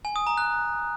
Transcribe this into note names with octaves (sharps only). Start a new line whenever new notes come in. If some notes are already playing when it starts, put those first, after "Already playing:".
G#5
D#6
A#5
F#6